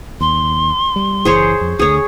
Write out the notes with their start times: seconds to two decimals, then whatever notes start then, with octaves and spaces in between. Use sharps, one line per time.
0.21 D#2 C6
0.96 G3
1.25 F#1 E3 G#4 C5 C#5
1.61 F2
1.79 D2 D3 G#4 C#5 D#6